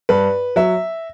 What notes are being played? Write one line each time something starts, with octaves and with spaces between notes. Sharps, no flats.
G2 B4
F#3 E5